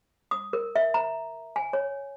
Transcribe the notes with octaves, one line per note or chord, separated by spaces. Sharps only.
D#6
A#4
E5
A#5
G#5
C#5